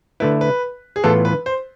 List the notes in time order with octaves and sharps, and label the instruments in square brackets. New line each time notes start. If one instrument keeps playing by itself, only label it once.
[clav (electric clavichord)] D3 A3 E4 [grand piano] B4
[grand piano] B4
G#4
[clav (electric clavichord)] A2 E3 B3 F4 [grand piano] A4
[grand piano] B4
C5